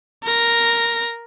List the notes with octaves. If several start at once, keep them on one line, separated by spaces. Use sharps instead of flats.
A#4 A#6